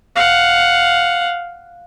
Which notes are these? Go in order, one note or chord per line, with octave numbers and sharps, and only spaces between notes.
F5 F#5